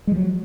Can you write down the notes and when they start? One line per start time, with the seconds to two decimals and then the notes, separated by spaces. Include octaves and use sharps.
0.07 G#3
0.12 F3
0.16 F#3